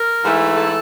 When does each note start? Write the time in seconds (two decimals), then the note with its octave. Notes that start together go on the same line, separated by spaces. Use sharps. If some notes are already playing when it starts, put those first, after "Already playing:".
Already playing: A#4
0.23 G#2 E3 A3
0.58 A4